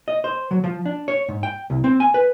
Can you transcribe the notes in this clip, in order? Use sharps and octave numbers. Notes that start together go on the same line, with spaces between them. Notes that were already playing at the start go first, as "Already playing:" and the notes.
D#5
C5
F#3
F3
D4
C#5
G#2
G5
C2
C4
G#5
B4